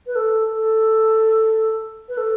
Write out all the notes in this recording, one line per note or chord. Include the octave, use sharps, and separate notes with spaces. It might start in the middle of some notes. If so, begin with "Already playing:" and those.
B4
A4
A4
B4
A4